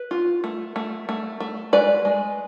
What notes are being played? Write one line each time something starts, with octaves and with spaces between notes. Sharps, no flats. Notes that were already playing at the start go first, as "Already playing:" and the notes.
Already playing: B4
F4
A3
A3
A3
A3
G#3 B4 D5
G#3